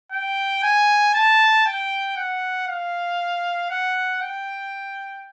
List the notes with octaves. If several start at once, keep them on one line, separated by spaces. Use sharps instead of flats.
G5
G#5
A5
G5
F#5
F5
F#5
G5